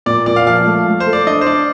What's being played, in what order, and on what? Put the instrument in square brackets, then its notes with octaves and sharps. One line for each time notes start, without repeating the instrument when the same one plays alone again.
[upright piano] A#2 [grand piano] D5
[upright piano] A#2 [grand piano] D5
[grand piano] F5
[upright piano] F3 [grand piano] F5
[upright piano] A3
A3
[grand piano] C5
[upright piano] A4
[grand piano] D5
[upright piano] D4 [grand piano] D#5
[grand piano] C5
[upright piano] D4 [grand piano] D5